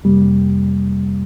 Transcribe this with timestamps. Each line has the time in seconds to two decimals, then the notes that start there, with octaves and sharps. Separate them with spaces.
0.04 F2 C3 G3 A#3